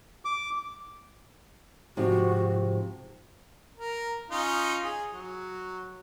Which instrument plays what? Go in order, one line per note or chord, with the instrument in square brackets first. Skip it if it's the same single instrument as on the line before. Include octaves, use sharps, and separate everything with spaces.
[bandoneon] D6
[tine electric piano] G#2 [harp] C3 F3 [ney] F#4
[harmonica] A#4
C#4 D#4 F4
G#4
F#3